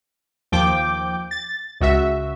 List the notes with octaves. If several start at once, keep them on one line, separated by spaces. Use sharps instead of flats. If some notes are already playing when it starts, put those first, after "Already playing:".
D#2 F3 G5 D6
A6
C#2 F#4 E5